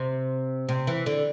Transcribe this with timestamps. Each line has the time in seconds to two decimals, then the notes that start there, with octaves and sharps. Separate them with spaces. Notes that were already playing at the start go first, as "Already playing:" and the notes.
Already playing: C3
0.69 C3
0.87 E3
1.06 D3